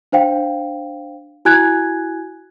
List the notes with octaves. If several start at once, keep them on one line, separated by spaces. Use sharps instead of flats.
D4 C5 F5 G5
E4 F#4 G#5 F#6 G#6